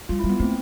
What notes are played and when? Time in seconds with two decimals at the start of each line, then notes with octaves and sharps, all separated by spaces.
0.09 G3 F4
0.19 E4
0.24 G3
0.30 B3
0.40 A3 C4